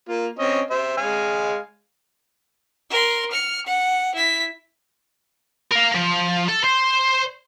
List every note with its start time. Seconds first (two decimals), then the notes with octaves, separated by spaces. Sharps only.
0.09 A#3 F4
0.39 C4 C#4 D#5
0.71 C5 E5
0.98 G#3 F5 G#5
2.90 A#4 C6
3.31 F6 C#7
3.66 F#5
4.14 E4 B6
5.72 A#4 F5
5.95 F3
6.49 A4
6.64 C5